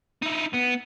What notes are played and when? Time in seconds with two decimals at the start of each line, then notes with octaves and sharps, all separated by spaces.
0.23 D#4 E4
0.54 B3